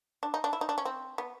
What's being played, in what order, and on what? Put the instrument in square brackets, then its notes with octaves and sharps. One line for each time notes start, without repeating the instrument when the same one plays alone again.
[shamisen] D4
D#4
D4
E4
D#4
D4
C#4
C4
B3